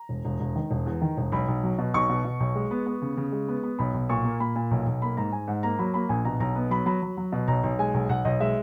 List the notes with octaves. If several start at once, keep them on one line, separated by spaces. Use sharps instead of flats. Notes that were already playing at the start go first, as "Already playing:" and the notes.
Already playing: A#5
E1
E1
E1
D#3
E1
E2
D#3
E1
B1 B5
B1
F#3
B2
B1 C#6
B2
B2
B1
G#3
B3
B3
C#3
C#3
G#3
B3
B3
B1 B5
B1
A#2 C#6
A#3
A#2 B5
A#2
B1
B1
A#3 B5
G#2 A#5
G#2 G#5
G#2 F#5
A#3 A#5
F#3 B5
A#3 B5
A#1 G#5
B2 A#5
B1 A#5
B3
F#3 B5
F#3 B5
F#3
F#3
B2
B1 A#5
B1
G#3 G#5
B1
B1 F#5
B1 D#5
G#3 E5